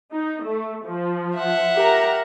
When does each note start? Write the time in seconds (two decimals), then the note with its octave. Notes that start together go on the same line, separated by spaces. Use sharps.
0.12 D#4
0.43 A3
0.85 F3
1.37 E5 F#5
1.74 G4 A#4 A#5